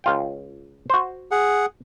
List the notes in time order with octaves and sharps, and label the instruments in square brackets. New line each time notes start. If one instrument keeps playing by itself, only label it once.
[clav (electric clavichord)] C#2 F4 G5
F#4 C5
[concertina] G#4 F#5